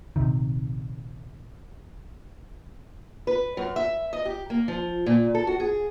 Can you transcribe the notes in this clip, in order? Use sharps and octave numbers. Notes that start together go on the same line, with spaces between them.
A#1 C3 D#3
B4
F#2
E5
D#5
G4
A#3
F3
A#2
A4
F#4
G#4